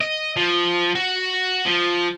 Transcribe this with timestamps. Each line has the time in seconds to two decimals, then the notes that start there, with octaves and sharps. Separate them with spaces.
0.01 D#5
0.36 F3
0.95 F#4
1.66 F3